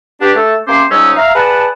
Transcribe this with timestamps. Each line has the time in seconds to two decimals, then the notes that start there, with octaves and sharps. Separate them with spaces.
0.20 B3 D4 G4
0.36 A3 A4
0.68 C3 A#3 C#4 C5 C6 D6
0.90 C#2 G#2 G3 C#4 D#4 E6
1.17 E5 F5 A#5
1.35 G#4 B4 D5 F#5 A5